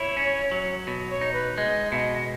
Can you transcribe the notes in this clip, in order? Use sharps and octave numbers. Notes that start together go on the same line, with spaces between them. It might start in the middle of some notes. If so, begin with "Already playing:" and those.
Already playing: E4 C#5
C#4
F#3
B2
C#5
D#4
B4
G#3 D#5
B2 D#5 E5